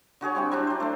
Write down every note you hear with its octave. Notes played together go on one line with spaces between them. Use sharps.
D3 F#4 G#4 C#5
G3 C4 E4 G5
F#3 C4 D4
C5 D5
A3 C5